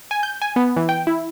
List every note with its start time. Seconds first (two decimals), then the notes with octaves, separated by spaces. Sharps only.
0.11 G#5
0.23 G6
0.42 G#5
0.56 B3
0.76 E3
0.89 G5
1.07 E4